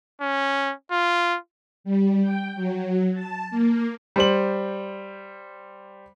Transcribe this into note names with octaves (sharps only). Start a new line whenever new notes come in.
C#4
F4
G3
G5
F#3
A5
A#3
G3 C5 F#7